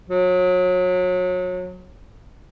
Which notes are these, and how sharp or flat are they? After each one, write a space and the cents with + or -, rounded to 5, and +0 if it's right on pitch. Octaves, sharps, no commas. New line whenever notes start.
F#3 -30